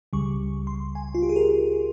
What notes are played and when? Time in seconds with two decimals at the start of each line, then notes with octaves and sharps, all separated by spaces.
0.13 C#2 C#3 G3 C#6
0.67 C6
0.95 G#5
1.15 F4
1.22 G4
1.29 G#4
1.36 A#4